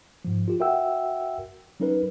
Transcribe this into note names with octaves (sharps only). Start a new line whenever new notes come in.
G#2 F3
F4 G4
F#4 A#4 E5 F#5 G5 E6
F#3 C#4 D#4 A#4 B4